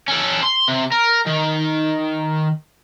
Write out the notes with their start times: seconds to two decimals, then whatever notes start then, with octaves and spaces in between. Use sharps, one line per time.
0.08 C#4 A4
0.43 C6
0.68 C3
0.92 A#4
1.27 D#3